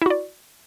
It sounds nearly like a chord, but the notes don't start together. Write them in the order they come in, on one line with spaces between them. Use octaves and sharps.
E4 F#4 D5